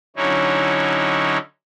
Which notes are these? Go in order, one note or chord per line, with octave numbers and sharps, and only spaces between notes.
D3 F#3 C#4 D#4 E4